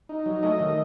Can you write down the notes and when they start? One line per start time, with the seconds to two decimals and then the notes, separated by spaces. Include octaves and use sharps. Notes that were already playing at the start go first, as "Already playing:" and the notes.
0.09 D#4
0.26 F#3
0.43 A3 D#5
0.60 D#3